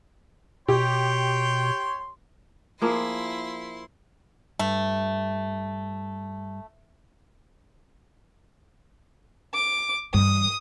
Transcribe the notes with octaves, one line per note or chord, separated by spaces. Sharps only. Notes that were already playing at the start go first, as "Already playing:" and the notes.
B2 G4 C#5 G5 C6
F3 A#3 E4 G#4 C6
G2 A3
D6
G2 E3 D#6